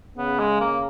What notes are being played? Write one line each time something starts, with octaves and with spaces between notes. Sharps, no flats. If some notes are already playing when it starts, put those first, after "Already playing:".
C#3 B3
G#3
A#3